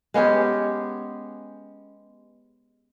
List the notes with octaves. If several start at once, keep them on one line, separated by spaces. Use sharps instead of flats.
G#3 B3 C#4 G4